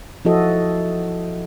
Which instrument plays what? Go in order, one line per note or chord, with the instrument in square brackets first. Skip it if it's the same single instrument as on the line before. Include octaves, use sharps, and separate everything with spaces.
[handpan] F3 E4 F#4 A4 D#5